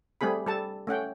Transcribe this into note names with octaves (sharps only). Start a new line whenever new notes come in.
G3 A3 C4 G#4 B5
G3 A4 A5
A3 C#4 F#5 G5